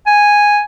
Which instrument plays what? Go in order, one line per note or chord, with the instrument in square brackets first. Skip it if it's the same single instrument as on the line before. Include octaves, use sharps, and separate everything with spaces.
[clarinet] G#5